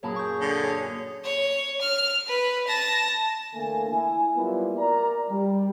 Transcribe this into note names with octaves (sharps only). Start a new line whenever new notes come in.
F#2 A#2 G#4 C#5 A5 B5
C#6 G6
D3
C#5 G#6
C#5
F6
B4
A5 A#6
D3 E3 A3 A#3 G#5
E4 G#5
F#3 G3 A#3 B3 E4 F4
A#4 D5 A#5
G3